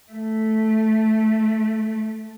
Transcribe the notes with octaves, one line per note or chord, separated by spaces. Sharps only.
A3